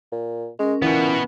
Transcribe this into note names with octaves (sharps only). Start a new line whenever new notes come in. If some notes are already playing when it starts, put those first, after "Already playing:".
A#2
G#3 C#4 A#4
A#2 E3 B3 F#4